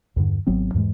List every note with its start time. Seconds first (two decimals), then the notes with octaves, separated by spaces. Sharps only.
0.16 E2 G2 D3
0.47 G#1 F#3 B3 C4
0.74 E2 G#2 E3 G#3